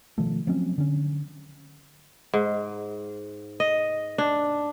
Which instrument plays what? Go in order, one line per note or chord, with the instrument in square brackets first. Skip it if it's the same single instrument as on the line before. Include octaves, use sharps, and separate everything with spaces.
[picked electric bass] B2 D#3 F3 A3
F3 F#3 C4 C#4
D3 C#4
[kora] G#2
D#5
D4